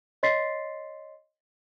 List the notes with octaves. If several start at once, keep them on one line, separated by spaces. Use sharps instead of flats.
C#5 D#5 C6 A6 B6 C7